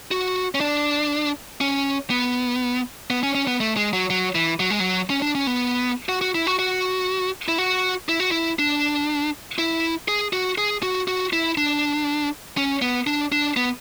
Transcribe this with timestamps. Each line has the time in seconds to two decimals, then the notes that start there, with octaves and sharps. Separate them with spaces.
0.11 F#4
0.55 C#4
0.60 D4
1.61 C#4
2.10 B3
3.10 B3
3.23 C#4
3.35 C#4
3.48 B3
3.60 A3
3.77 G#3
3.93 F#3
4.10 F#3
4.35 E3
4.60 F#3
4.70 G#3
4.80 F#3
5.10 C#4
5.22 D4
5.35 C#4
5.47 B3
6.09 F#4
6.21 F#4
6.35 E4
6.47 F#4
6.59 F#4
7.48 E4
7.58 F#4
8.09 E4
8.20 F#4
8.31 E4
8.59 D4
9.58 E4
10.08 G#4
10.33 F#4
10.58 G#4
10.83 F#4
11.08 F#4
11.33 E4
11.58 D4
12.57 C#4
12.82 B3
13.07 D4
13.32 D4
13.57 B3